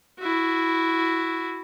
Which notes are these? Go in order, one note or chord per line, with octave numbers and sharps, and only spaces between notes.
E4 F#4